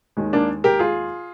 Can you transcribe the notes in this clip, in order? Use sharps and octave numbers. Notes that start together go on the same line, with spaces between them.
D#2 D#3 G#3
A#3 D4
G4 A#4
F4 G#4